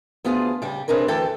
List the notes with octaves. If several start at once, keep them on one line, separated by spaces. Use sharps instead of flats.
D2 B3 F4 G#4 C5 A5
C#3 G3
C3 C4 D4 G#4 A#4 B4
D2 E3 A4 G5 A5